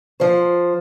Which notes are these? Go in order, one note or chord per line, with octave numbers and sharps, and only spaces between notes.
F3 C5